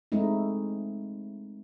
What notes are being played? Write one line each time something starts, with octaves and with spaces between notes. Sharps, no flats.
G#3 A3 C4 D#4 E4